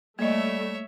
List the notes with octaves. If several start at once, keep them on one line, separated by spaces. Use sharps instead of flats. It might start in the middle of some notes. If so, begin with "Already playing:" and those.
G3 A3 A#3 C#5 D#5 E5